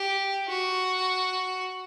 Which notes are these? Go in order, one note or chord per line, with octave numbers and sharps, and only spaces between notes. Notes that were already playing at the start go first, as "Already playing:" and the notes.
Already playing: G4
F#4